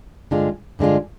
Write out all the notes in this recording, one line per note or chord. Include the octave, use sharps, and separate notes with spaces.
G2 D3 G#3 D4 F4
G2 D3 G#3 D4 F4